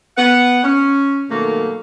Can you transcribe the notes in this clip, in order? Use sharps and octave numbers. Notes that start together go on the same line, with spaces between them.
B3 F#5
C#4
B2 D#3 F#3 A3 A#3